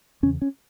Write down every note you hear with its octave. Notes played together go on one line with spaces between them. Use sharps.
E2 C#3 C#4
C#4